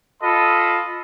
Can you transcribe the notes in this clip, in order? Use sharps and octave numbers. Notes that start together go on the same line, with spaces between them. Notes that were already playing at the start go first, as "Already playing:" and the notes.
F4 A4 D#5 B5